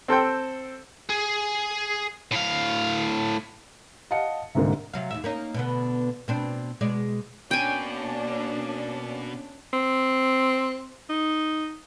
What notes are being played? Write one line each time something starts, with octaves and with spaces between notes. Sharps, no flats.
C4 A4 C5 G5
G#4
A2 F5
D#5 F5 F#5 A5 C#7
C2 G#2 D3 A#3
C3 F#3 F5
D#2 A#2 E5
A#3 C#4 D#4
B2 D3 B3
B2 C4 D4
B2 G#3 D5
B2 A#3 C#4 D4 D5 G5 G#5
C4
D#4